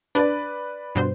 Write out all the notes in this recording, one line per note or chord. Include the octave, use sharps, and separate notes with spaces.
D4 B4 D5
G2 B2 C5